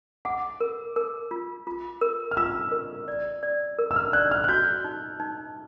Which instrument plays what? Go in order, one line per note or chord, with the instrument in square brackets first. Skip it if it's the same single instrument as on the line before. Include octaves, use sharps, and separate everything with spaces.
[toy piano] F#5 [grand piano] D6
[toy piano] A#4
A#4
F4
F4
A#4
[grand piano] F6
[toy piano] F4 [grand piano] E6
[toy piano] A#4
D5
D5
A#4
[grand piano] E6
F6
[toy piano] D5 [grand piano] F#6
[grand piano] F6
F#6
[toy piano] F#4 [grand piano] G6
[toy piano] D#4
D#4